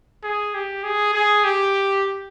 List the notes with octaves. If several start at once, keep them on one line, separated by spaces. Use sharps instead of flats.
G#4
G4
G#4
G#4
G4